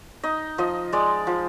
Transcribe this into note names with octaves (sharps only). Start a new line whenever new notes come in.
D#4 D#5
F3 D#5
G#3 D5
F3